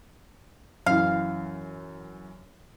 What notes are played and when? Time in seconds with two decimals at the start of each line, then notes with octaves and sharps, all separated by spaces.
0.86 F#2 E3 F5